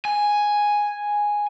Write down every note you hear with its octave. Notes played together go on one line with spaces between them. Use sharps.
G#5